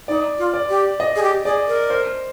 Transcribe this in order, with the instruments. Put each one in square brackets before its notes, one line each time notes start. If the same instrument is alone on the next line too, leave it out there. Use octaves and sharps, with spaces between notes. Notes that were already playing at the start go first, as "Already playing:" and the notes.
[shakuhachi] D#4 [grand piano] D5
[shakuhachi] F4
[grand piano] D5
[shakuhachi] G4
[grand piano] D#5
[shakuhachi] G#4
G4
[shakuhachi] G#4 [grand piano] D5
[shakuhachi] A#4
[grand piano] C5